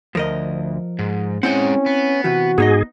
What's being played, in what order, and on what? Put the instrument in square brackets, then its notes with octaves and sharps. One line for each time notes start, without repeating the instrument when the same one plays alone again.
[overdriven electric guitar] D2 [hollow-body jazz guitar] F3 A#4 D#5
[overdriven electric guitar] G#2
[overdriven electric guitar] G#3 F#5 [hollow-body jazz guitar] C4 E4 G5 [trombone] C#4
[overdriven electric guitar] B3
[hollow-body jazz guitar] C3 E3 [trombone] F#4
[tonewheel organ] G#2 G#4 [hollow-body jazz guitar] B3 D#4 D#5